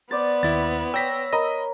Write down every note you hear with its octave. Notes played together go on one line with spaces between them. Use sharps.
B3 C5 D5 A6
D#2 E4 A6
C#5 G5 E6 A#6 B6
A#4 D#5 B5 D#6